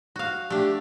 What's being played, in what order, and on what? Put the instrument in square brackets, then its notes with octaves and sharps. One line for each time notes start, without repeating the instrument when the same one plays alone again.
[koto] F#4 F5
[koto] A3 D4 [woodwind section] G4